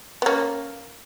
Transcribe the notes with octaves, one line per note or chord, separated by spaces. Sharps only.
B3
A#3 C#4